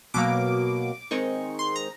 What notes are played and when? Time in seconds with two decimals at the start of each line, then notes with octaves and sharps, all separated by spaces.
0.14 B2 F#3 A#3 D6
1.11 D#3 G#3 C4 D#4 C#6
1.59 C6
1.76 A#5